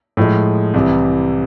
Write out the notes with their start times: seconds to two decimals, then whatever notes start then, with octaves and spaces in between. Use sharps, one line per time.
0.17 A2 F3 G#3
0.74 C2 C3 E3